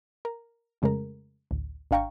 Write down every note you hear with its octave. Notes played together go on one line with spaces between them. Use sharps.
A#4
F2 C#3 G#3 A3 A#4
A1 D2
G#1 D4 F5 G5 A#5 C#6